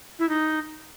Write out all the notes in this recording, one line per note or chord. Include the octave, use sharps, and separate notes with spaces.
E4
D#4